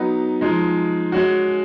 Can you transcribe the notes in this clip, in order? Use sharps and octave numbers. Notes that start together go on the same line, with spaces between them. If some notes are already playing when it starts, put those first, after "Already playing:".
Already playing: F#3 B3 D#4
F3 G#3 D#4
G#3 C#4 F#4